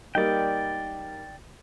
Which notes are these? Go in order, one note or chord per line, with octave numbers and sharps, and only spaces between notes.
G3 A#3 D#4 D5 G5